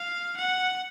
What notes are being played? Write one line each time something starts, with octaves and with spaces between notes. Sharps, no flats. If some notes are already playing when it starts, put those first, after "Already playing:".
Already playing: F5
F#5